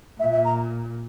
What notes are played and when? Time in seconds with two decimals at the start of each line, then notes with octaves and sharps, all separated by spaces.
0.19 A#2 E5
0.32 E5
0.45 A#5